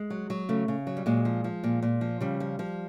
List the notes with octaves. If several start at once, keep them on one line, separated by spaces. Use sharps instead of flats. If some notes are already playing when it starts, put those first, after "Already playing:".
Already playing: G#3
F#3
F#3
C#3 A3
C#3
F#3
G3
A#2 G#3
F3
F3
A#2
A#2
F3
C#3 G3
F3
F3